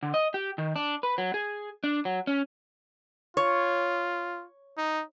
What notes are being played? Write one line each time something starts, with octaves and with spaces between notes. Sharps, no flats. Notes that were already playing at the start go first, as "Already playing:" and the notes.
D3
D#5
G4
D#3
D4
B4
F#3
G#4
D4
F#3
C#4
F4 C#5
D#4